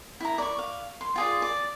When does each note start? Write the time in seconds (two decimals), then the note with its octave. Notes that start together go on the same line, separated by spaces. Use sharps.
0.20 E4 A#5
0.38 D5 C#6
0.59 F5
1.01 C6
1.16 F4 G#4 D5
1.42 D5